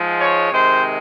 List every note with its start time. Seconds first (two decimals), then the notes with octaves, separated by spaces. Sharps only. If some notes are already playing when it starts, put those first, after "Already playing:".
Already playing: G#2 F3 G#3
0.18 C#5
0.52 C3 D#3 G#3 C5